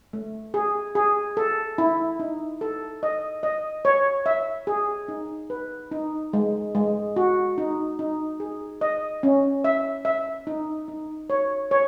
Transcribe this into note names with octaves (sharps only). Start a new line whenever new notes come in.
A3
G#4
G#4
A4
E4
D#4
A4
D#5
D#5
C#5
E5
G#4
D#4
B4
D#4
G#3
G#3
F#4
D#4
D#4
G#4
D#5
C#4
E5
E5
D#4
D#4
C#5
C#5